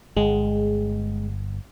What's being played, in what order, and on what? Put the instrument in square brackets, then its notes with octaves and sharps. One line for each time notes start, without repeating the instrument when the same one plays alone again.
[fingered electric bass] G1 [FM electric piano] G#3